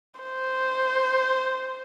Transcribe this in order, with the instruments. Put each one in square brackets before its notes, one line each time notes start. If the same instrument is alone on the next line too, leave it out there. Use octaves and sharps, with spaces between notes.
[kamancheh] C5